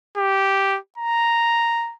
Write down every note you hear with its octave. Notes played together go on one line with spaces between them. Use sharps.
G4
A#5